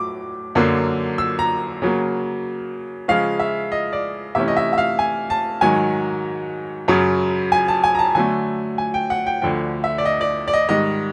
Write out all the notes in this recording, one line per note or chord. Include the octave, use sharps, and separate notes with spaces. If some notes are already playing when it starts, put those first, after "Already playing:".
Already playing: A2 F#3 A3 D6
F#2 D3 F#3 A#3
E6
A#5
C#3 F#3 A#3
C#3 F3 G#3 C#4 F5
E5
D#5
D5
C3 E3 A3 C#4 E5
D#5
E5
E5
F5
G#5
A5
G#2 D#3 F#3 G#5
F#2 C#3 F#3
G#5
A5
G#5
A#5
A5
D3 F#3 A3 G#5
G#5
G5
F#5
G5
D2 D3 F3 G5
E5
D5
D#5
D5
D5
D#5
G#2 D#3 G3 D#5